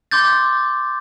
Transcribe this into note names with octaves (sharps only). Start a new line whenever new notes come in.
C6 D6 G6 A6